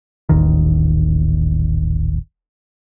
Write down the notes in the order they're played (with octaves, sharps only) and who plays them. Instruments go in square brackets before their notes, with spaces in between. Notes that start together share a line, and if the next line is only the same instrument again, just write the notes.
[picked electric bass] D#1 A1 D#2 D#3